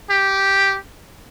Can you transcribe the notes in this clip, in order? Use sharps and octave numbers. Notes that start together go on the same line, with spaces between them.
G4